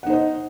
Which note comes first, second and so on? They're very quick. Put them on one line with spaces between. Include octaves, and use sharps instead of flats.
F#5 D#4 C5 D#5